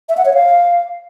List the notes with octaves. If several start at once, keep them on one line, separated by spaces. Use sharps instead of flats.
E5
F#5
C#5
F5